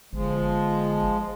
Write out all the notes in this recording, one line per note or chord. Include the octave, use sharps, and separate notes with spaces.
G1 F3 G#3